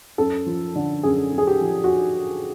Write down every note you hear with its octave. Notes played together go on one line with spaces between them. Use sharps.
F#2 A4
F3
D3
F#2 G#4
F#2
G#4
G4
F3
F#4